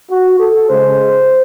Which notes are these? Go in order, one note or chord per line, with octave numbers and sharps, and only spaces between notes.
F#4
A4
C#3 G#3 C5